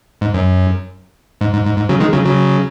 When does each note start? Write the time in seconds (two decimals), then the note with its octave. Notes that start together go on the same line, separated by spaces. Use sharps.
0.21 G#2
0.34 F#2
1.41 G#2
1.53 G#2
1.65 G#2
1.77 G#2
1.89 C#3 F#3
2.00 D#3 G#3
2.13 C#3 F#3
2.25 C#3 F#3